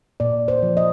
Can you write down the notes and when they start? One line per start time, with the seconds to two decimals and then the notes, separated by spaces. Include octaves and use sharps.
0.20 A#2 D5
0.48 C5
0.63 F3
0.77 D#5